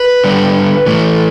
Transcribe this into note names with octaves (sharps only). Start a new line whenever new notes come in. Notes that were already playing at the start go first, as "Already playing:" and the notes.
Already playing: B4
D3 G3
A2 E3 A3